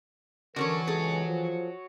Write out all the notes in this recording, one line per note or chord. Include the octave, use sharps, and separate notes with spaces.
D3 E3 C#4 F#4 A4 A#4 C#5
C#2 G#4 A4
F3